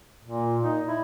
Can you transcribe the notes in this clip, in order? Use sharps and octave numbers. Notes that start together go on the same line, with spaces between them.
A#2
D#4
E4